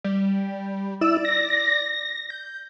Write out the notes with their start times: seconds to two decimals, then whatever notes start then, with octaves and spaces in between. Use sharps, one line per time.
0.04 G3
1.01 E4 D5 E6
1.25 A#6
2.30 G6